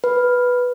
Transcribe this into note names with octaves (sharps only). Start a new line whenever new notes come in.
B4